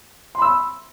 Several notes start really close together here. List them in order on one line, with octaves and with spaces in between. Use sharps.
C6 B5 E6